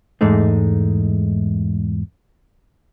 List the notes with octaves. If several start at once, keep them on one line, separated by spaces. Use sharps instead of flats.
E2 G#2 G#3 A3 D#4